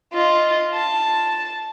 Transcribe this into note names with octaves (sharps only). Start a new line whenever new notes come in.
F4 D#5
A5